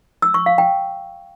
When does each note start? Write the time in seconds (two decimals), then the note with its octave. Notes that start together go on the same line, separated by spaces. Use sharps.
0.22 E6
0.34 C#6
0.46 F5
0.58 G5